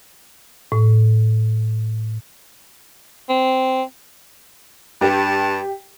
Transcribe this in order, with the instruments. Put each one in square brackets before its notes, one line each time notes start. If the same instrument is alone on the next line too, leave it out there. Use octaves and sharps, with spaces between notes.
[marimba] A2
[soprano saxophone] C4
[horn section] G2 A5 [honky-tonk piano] G4 G5